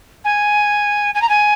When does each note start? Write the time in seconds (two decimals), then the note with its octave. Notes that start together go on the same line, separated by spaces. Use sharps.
0.24 G#5
1.14 G#5
1.21 A#5
1.29 G#5